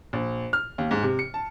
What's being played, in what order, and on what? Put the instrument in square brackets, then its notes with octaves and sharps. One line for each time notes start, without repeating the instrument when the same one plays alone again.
[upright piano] A#1
F6
D#2
G#2
C3
C#7
A5